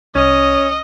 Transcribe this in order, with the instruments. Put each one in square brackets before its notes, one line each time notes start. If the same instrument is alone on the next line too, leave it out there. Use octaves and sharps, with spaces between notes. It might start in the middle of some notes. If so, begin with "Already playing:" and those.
[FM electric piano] C2 [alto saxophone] C#4 [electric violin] D#5